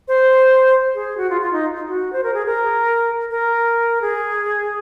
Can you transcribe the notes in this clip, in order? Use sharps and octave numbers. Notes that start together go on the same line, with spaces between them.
C5
G#4
F#4
F4
F4
D#4
F#4
C5
A#4
G#4
A#4
A#4
G#4